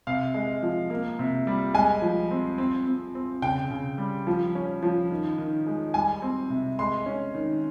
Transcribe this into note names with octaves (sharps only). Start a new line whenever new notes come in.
C3 F5
G#3
F3
A#3
C3
G3
G#3 G#5
F3
C4
C4
C4
C4
C#3 G5
C#3
G3
F3
C#4
F3
D#3
D#3
G#3
G3 G#5
C4
C3
G#3 C6
C#4
D#3